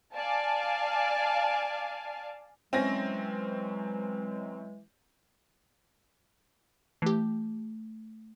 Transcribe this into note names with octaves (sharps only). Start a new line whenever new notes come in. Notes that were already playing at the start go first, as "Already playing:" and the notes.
D5 F5 G#5 A5
E3 F#3 G#3 C4 C#4 A#6
E3 A3 G4